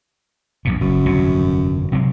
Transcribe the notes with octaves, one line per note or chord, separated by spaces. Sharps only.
A#1 F2 B2
F#1 F#2
G1 F2 C3
C3 F#3 C4